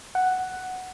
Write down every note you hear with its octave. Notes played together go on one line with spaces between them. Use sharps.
F#5